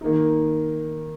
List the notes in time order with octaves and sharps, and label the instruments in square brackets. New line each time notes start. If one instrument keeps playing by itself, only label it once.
[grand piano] D#3 A#3 D#4